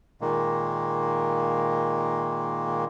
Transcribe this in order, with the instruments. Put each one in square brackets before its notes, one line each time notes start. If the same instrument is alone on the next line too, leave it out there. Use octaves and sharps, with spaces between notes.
[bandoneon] A#2 D#3 G#3 A#3